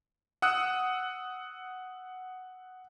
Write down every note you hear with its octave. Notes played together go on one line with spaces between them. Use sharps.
F#5 D#6 E6 F#6